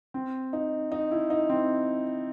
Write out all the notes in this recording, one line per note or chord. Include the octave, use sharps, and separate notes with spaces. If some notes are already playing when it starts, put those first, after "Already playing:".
C4
D#4
D#4
E4
D#4
C4